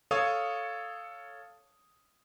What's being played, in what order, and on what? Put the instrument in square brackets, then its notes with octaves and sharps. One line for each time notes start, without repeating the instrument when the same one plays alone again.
[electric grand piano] A4 C#5 F5 C#6 D#6 G#6